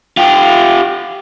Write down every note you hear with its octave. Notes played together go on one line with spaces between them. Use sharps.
F4 G4